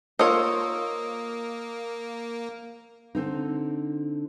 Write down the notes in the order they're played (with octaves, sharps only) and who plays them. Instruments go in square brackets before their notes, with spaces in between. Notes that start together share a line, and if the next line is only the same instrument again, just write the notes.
[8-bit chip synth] A#3 [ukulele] F4 A#4 D#5 [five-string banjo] C5 C#5 [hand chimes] D#6 E6
[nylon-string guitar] D3 C4 D#4